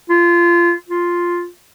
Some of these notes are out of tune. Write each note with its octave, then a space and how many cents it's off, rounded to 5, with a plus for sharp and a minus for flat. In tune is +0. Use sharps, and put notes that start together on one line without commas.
F4 -25
F4 +0